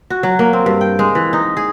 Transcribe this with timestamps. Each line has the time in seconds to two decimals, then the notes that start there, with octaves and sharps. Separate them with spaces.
0.10 F#4
0.23 F#3
0.39 A#3
0.53 C4
0.66 G2
0.81 G5
0.99 G#3
1.15 E3
1.33 D#4
1.57 G#4